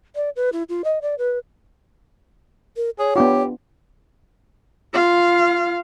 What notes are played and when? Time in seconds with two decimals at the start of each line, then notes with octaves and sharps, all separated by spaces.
0.16 D5
0.36 B4
0.53 E4
0.69 F4
0.84 D#5
1.02 D5
1.18 B4
2.77 A#4
2.99 G#4 C#5
3.16 B3 D4 F4 G4
4.94 F4 F5